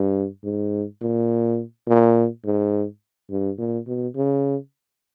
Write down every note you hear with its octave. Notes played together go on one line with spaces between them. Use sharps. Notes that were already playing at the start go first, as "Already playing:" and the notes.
Already playing: G2
G#2
A#2
A#2
G#2
G2
A#2
B2
C#3